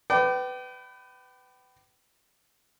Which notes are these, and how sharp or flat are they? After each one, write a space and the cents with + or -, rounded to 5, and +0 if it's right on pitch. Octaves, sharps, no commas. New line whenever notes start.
B4 +20 D5 +20 G5 -35